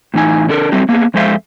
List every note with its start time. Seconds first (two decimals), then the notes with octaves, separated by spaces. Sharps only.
0.14 A2 E3 D#4 G#5
0.49 D3 D4 A4 A#4
0.72 F#3 G3 C4 A4
0.89 A#3 B3 G#4
1.14 F2 G#3 A4 C5 E5 F5